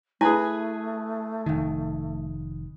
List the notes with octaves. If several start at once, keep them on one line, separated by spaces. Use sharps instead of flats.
A3 E4 G#4 B4 G#5
F1 D#3